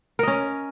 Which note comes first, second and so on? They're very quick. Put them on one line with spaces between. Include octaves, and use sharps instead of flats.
A#4 D#5 C#4